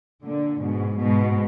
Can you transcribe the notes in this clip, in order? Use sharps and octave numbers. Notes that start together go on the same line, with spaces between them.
A#2 D3
G#2 B2
G#2 B2